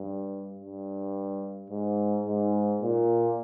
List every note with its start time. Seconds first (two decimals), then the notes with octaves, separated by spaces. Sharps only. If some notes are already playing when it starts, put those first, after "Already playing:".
Already playing: G2
0.59 G2
1.70 G#2
2.26 G#2
2.81 A#2